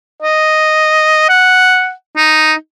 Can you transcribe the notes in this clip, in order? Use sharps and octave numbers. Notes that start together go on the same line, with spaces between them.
D#5
F#5
D#4